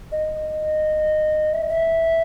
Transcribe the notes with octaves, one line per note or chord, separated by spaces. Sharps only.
D#5
E5
D#5
E5